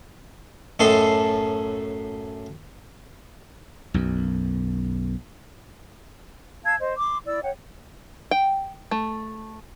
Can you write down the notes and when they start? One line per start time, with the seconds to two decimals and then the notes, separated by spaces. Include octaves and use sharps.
0.79 F#2 A2 A4 D#5 C6
3.94 B1 F#2
6.65 F5 A5 E6 G#6
6.79 C5 D#5
6.97 C6 D6
7.25 E4 D5 E6
7.42 C#5 F#5 G5
8.31 G5
8.91 A3